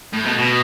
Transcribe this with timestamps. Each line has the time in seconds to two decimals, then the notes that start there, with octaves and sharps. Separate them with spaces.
0.13 A2
0.26 B2
0.38 B2